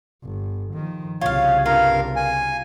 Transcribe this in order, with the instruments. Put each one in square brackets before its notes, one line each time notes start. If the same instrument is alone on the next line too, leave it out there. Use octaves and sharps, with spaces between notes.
[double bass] G1
D#3 F3
[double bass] C2 C#3 [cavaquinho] F4 F5 [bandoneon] C#5
[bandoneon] G2 A#4 F5 [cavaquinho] F4
[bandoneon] G#5